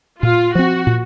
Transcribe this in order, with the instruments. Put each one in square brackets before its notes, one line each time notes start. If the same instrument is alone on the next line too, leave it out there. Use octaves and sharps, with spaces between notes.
[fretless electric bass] A#2 [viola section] F4
[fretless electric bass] F3 C4 [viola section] F#4
[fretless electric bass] A#2